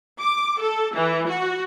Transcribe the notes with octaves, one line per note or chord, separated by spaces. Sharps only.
D6
A4
E3
F#4